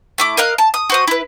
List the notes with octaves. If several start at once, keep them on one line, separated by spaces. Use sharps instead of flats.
A3 E4 D6
A#4 D#5 F5 F#6
A5
D#6
F#4 C5 D#6
E4 B4